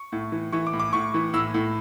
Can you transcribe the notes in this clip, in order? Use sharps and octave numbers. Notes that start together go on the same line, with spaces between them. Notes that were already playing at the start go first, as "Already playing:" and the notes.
Already playing: C#6
A2
E3
E3 C#6
D6
A2
D6
A2 C#6
E3
A2 E6
A2